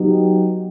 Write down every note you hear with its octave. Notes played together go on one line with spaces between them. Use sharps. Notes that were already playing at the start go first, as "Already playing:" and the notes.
Already playing: F#3 B3 D#4 G4